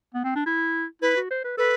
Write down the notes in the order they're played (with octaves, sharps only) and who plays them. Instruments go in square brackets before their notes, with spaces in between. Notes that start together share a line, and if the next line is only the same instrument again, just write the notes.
[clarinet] B3
C4
D4
E4
[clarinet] E4 [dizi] B4
[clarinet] F#4
C5
B4
[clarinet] A4 [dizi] B4